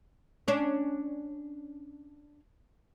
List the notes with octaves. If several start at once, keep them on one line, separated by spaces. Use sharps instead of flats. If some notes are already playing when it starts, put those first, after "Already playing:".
C#4 D4